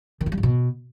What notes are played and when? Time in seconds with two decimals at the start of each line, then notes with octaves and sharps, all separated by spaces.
0.21 D#3
0.26 G2
0.32 G3
0.38 G#2
0.43 B2